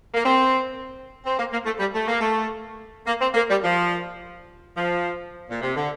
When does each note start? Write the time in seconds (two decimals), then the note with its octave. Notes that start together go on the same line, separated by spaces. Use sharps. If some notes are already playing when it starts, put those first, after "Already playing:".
0.14 A#3
0.24 C4
1.25 C4
1.37 A#3
1.51 A#3
1.64 A3
1.79 G3
1.93 A3
2.07 A#3
2.20 A3
3.06 A#3
3.20 C4
3.35 A#3
3.49 G3
3.63 F3
4.75 F3
5.49 A#2
5.61 C3
5.75 D3